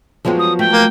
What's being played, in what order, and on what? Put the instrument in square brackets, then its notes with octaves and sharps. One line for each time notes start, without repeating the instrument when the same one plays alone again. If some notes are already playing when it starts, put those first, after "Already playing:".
[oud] F#2 G#3 G4 [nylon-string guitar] F3 F#3 B3
[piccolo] D#6
[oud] A3 [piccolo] G5
[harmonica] A#3